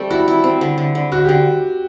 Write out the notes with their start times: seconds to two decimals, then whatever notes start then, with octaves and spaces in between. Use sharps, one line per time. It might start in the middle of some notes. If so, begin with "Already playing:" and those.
Already playing: G3 A3 C4 A4
0.10 E4 F#4
0.28 E4
0.44 C4
0.61 D3
0.78 D3
0.95 D3
1.12 D3 F#4
1.25 G4
1.29 D3